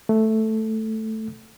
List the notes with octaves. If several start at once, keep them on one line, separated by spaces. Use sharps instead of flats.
A3